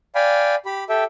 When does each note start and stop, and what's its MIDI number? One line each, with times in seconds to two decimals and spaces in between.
0.15 0.55 74
0.15 0.55 77
0.15 0.55 79
0.15 0.55 80
0.15 0.55 83
0.66 0.84 67
0.66 0.84 83
0.89 1.04 67
0.89 1.04 69
0.89 1.04 76
0.89 1.04 79